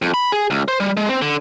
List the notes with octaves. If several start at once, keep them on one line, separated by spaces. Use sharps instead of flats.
F2
B5
G#4
C#2
C5
G3
G#3
C4
D3